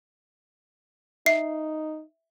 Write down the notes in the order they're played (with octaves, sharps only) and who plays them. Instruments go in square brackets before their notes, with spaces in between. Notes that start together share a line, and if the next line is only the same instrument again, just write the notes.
[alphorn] D#4 [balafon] E5 [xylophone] C7